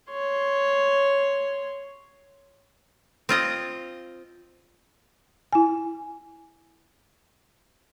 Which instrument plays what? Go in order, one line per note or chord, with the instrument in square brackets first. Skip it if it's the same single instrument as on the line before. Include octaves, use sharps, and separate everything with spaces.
[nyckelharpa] C#5 C6
[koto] C4 F4 D#5
[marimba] E4 G#5